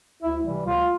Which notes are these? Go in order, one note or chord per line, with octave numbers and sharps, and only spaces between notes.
D2 E4
C3 E3 G3
D2 F4